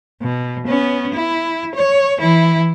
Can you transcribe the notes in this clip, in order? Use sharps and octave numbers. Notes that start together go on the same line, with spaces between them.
B2
B3 C#4
E4
C#5
E3 E4